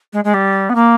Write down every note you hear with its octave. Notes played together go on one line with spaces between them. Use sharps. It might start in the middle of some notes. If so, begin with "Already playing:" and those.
G#3
G#3
G3
B3
A#3